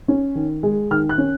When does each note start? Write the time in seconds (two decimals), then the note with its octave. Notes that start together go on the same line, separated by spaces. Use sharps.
0.08 C#4
0.35 D#3
0.63 G#3
0.91 D#3 F6
1.09 F#6
1.18 C#4